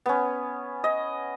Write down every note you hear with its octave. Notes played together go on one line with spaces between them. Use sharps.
B3 C#4
D#5